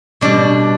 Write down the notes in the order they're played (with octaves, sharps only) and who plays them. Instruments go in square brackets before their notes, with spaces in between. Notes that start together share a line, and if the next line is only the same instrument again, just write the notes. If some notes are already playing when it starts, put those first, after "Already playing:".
[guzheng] B2 G3 D4